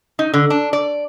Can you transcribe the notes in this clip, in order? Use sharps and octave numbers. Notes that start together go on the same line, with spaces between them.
D#4
D3
D4
D5